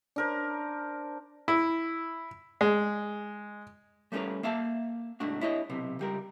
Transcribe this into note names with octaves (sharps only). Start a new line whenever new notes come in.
D4 A#4 C5
E4
G#3
G3 A3 C#4 F4 A#4 B4
A#3 E5 F5 A5
C2 G#2 A3 D4 F#4
E4 C#5 D#5
B1 C3 B3
C#2 G3 A#4